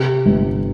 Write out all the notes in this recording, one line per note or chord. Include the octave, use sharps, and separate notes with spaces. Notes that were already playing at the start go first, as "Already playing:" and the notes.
Already playing: C3
G1